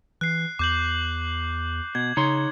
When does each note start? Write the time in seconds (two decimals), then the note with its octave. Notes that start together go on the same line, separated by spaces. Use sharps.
0.21 E3 F#6 C7
0.59 E2 D6 G6 F#7
1.95 B2 G#6
2.17 C#3 D#4 C#5 C6